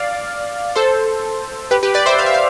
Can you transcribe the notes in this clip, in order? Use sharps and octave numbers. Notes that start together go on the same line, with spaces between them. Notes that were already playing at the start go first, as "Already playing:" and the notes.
Already playing: D5 F5
A4 C5
G4 B4
G4 B4
B4 D5
C5 E5
F5
E5
F5